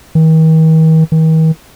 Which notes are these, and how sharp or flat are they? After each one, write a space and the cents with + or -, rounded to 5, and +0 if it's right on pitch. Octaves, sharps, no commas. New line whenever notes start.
D#3 +45
D#3 +45